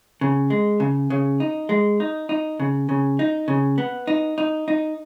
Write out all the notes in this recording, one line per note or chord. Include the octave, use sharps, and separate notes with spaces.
C#3
G#3
C#3
C#3
D#4
G#3
D#4
D#4
C#3
C#3
D#4
C#3
B3
D#4
D#4
D#4